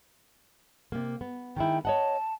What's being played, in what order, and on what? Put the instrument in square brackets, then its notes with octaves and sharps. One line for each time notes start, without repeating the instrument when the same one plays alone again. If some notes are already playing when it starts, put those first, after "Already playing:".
[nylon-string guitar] C3 A#3
B3
[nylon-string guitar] D#3 G#3 E4 [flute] G5
[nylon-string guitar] C#5 D#5 F#5 [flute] A5